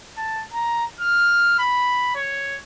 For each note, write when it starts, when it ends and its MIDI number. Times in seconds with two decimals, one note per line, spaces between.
0.17 0.44 81
0.53 0.85 82
1.00 1.57 89
1.59 2.11 83
2.15 2.59 73